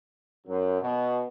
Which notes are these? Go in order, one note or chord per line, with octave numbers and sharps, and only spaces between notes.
F#2
B2